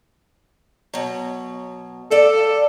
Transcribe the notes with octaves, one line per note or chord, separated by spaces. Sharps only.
B2 F#3
A4 D5 F5